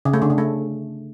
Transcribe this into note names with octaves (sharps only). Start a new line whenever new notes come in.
C#3
A3
D3
C#3
A3